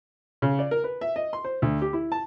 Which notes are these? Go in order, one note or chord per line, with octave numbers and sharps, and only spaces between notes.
C#3
D5
A#4
B4
E5
D#5
C6
C5
D2
G4
E4
A5